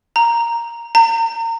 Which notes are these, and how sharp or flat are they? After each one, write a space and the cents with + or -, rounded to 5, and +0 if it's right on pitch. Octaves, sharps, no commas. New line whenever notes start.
A#5 +0
A#5 -30